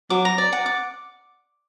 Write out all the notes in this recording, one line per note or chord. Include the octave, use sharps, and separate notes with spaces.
F#3 D6
A#5
D5
F#5
D6